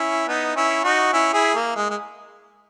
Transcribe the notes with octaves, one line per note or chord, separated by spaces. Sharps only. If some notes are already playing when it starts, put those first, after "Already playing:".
Already playing: C#4 E4
B3 D#4
C#4 E4
D#4 F#4
C#4 E4
E4 G#4
A#3
G#3
G#3